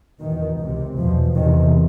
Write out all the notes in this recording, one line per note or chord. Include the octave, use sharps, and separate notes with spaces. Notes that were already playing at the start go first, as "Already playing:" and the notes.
E2 B2 D#3
C#2 C3
E2 B2 F3
E2 C3 D#3